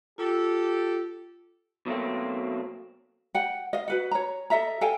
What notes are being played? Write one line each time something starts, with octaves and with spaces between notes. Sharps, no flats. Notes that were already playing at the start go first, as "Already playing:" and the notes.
F4 G4 A4
B2 F#3 A3 A#3 C4
F#5 G5
D#5 F5
F#4 B4 F#5
C#5 A#5
A4 D#5 E5 A#5
A4 F5 G5 G#5